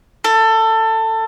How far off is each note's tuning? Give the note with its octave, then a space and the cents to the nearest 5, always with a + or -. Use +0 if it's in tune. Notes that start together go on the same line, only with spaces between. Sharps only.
A4 +20